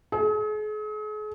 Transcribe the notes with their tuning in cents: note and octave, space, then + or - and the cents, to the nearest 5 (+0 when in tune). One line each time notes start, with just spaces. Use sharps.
G#4 +40